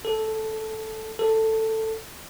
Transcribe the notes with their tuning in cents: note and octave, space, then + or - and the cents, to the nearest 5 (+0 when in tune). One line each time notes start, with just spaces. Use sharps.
A4 -5
A4 +10